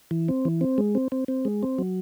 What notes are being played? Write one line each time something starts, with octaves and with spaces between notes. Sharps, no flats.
E3
C4
E3
C4
G#3
C4
C4
C4
G#3
C4
F#3